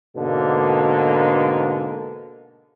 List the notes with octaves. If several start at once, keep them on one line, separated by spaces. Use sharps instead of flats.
G#2 B2 D3 A#3